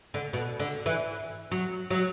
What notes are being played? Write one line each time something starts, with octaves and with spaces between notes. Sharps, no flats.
D3
B2
D3
E3
F#3
F#3